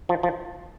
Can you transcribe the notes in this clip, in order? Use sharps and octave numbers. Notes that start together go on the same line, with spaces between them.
F3
F3